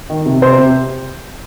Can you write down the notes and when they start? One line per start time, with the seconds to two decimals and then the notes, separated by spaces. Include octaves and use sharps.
0.10 D#3
0.26 C3
0.42 C3 C5
0.58 C3